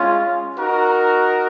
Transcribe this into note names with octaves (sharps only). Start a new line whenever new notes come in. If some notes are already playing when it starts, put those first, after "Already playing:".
Already playing: G#3 C#4 F4
D#4 F#4 A#4